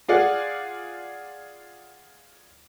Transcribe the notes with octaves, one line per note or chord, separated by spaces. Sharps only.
F4 G#4 D5 F#5